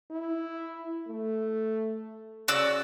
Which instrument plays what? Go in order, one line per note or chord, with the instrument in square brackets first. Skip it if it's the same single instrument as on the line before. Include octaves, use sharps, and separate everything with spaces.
[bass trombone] E4
A3
[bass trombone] C#3 [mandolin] F#4 D5 E6